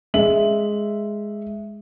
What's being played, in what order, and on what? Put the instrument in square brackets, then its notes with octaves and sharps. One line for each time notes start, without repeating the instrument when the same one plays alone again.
[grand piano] G#3 E5 F#7